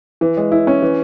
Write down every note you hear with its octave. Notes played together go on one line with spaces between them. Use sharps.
E3
G#3
E4
C#4
E3